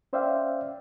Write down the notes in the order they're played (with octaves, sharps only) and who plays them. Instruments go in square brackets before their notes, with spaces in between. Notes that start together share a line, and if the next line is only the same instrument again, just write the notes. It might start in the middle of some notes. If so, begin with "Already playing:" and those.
[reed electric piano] C#4 C5 D5 E5 F5 G5